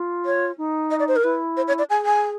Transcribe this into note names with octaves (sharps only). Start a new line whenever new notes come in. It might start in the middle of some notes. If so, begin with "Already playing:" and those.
Already playing: F4
C#5
D#4
D#5
D5
C5
A#4
E4 B4
C5
C#5
D5
G#4 G#5
G#5